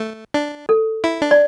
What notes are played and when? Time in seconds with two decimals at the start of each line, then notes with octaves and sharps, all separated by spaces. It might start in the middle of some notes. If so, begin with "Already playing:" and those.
Already playing: A3
0.34 D4
0.69 A4
1.04 E4
1.21 D4
1.31 D5